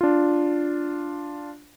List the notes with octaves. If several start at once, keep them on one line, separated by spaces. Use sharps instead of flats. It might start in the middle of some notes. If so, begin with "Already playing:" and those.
D4 F4